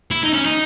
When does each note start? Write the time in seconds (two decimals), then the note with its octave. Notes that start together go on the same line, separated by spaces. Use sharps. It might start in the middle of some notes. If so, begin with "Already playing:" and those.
0.11 E4
0.23 D#4
0.34 C#4
0.45 D#4